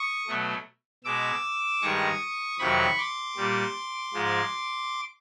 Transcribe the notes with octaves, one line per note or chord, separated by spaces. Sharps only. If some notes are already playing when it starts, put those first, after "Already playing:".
Already playing: C#6 D#6
B2 F#3 A3
B2 G#3 D6 E6
G2 D#3 G#3 C#6 D#6
F2 C3 D#3 F#3 B5 C#6
C6 D6
A#2 G3
G#2 F3 G#3